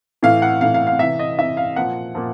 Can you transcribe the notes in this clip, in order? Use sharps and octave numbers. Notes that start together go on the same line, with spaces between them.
A2 E3 F5
F#5
A2 E3 F5
F5
F5
C3 E3 E5
D#5
C3 E3 E5
F5
A#2 F3 F#5
A#2 F3